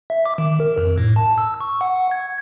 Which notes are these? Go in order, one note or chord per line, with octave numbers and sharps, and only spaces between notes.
E5
D6
D#3
A#4
F2
A2
A5
E6
C#6
F#5
G#6